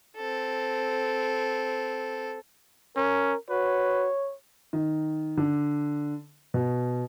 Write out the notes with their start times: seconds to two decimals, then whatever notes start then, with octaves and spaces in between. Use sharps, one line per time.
0.16 C4 A4
2.96 C#4 A#4
3.50 F#4 B4 C#5
4.73 D#3
5.37 D3
6.54 B2